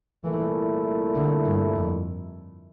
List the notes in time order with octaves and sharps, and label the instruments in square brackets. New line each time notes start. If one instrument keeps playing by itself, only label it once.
[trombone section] C2 A#2 A3 E4 A#4 [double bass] E3
[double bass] D3
G2
F2